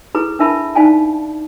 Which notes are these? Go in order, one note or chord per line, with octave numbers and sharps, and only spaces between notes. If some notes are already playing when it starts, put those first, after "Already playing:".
E4 G#4 A4 B4 A#5
D4 E4 A#4 E5 A5 B5
D#4 D5 F5 G#5 A5